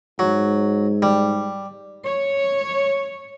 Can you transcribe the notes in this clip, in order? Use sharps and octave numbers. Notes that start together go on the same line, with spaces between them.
G#2 F#3
G3
C#5